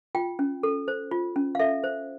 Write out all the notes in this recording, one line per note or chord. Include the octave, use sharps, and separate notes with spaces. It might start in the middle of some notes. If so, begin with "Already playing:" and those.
F4 G5
C#4
A4
C5
F4
C#4
F5
A4 E5
C5